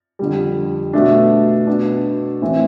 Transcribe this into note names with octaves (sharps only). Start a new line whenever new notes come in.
F2 D3 G3
B2 A3 D4
B2 B3 D4
A2 E3 A3 C4 E4